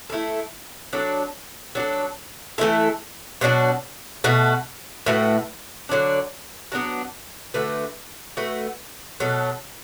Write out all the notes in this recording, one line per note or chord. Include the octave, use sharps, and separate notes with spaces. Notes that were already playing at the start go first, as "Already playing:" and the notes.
A3 E4 A4
F#3 D4 A4
F#3 D4 A4
E3 A3 E4 A4
B2 F#3 D4 F#4
B2 A3 F#4
A2 A3 F#4 B4
D3 F#3 D4
F#3 B3 D4 F#4
D3 A3 F#4 B4
A3 F#4 B4
B2 F#3 A3